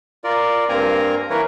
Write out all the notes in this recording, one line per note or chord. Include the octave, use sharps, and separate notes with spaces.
F4 A#4 D5
G2 A#3 C4 A#4 G#5 A#5
E3 A#3 A#4 B4 C#5